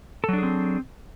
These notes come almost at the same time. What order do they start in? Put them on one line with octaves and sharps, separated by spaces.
A4 F#3 D4 G#4 C4